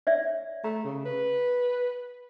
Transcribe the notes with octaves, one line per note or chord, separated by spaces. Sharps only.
C#5 D5 E5
A3 A#5
C#3
B4